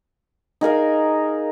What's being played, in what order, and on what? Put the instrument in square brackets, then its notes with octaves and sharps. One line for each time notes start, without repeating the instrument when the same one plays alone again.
[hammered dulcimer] D#4 G#4 A#4 F5